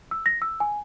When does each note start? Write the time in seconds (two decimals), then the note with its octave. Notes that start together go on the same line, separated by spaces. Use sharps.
0.11 E6
0.26 A#6
0.42 E6
0.60 G#5